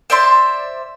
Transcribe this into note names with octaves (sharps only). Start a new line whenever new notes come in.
C5 D5 E5 C6